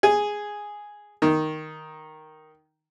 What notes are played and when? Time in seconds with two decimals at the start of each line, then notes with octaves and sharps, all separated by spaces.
0.03 G#4
1.22 D#3